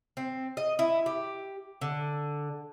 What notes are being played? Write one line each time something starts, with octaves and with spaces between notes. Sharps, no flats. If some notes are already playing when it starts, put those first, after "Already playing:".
C4
D#5
E4
G4
D3